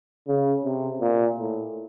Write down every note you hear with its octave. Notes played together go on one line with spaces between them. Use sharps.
C#3
C3
A#2
A2